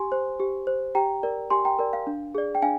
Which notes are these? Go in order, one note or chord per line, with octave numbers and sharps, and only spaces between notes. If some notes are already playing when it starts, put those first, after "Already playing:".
Already playing: G4 G#5 C6
C5
G4
C5
G4 G5 A#5
A#4 D5
G4 G#5 C6
G5 A#5
A#4 D5
F5
D4
G#4 D5
G5
D4 F5 G#5